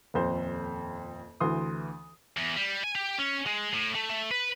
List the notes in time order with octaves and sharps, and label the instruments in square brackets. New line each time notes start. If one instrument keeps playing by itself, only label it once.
[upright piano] D#1 F2 C5
D2 E3 C6 D#6
[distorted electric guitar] E2
G3
G#5
G4
C#4
G#3
A2
A3
A3
B4